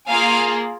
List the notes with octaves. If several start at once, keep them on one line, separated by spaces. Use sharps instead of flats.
A#3 F4 G#4 F5 G#5